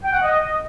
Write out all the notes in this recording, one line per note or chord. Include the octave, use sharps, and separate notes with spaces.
G5
F#5
D#5